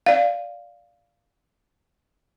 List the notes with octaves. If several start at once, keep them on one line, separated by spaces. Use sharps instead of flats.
D5 F5